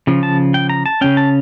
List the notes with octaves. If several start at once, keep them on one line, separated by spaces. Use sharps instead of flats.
C#3 F3
A5
G5
A#5
A5
C#3 F3 C#4 G5
A5